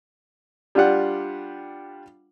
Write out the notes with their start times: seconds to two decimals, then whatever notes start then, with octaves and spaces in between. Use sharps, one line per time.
0.75 G3 D4 F4 G4 F#5